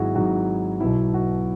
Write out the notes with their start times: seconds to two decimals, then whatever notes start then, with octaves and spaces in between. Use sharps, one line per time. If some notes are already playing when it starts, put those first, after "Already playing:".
Already playing: G#1 G#2 F#3 E4 F#4 G#4
0.15 G#1 G#2 F#3 F#4
0.80 B1 B2 F#3 E4
1.14 F#4